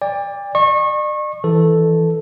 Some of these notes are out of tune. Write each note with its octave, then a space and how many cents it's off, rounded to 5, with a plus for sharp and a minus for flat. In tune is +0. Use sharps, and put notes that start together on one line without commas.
D5 +0 G5 +40
D5 +45 C#6 -30
E3 +0 A4 +0